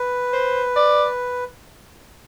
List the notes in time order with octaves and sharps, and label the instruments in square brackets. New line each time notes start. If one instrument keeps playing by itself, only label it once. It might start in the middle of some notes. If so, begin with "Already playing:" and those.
Already playing: [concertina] B4
[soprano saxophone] C5
D5